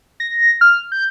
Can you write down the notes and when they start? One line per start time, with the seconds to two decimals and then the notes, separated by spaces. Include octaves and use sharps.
0.20 A#6
0.61 F6
0.92 G6